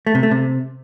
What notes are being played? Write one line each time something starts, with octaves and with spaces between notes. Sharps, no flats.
A3
C3
A3
C3